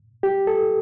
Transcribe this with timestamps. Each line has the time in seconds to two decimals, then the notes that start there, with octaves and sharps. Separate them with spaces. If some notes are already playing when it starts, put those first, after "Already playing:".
0.23 G4
0.47 A4